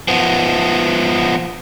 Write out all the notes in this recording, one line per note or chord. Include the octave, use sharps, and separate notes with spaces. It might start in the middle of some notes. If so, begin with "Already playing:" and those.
F3 B3